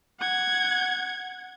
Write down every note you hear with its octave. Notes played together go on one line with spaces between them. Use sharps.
F#5 G#6